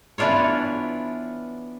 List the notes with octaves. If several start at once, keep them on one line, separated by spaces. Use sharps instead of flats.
E3 B3 D4 F4 C#5